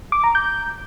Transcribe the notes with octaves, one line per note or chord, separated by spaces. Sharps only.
D6
A#5
G6